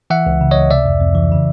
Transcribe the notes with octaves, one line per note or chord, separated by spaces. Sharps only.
E3 E5 F#5
C#2
C#3
C#2 C#5 D#5
C3 D5 E5
F2
F2
E3
C#3